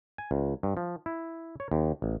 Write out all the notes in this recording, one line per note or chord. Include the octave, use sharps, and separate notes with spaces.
G#5
C#2
G2
F3
E4
C#5
D#2
A1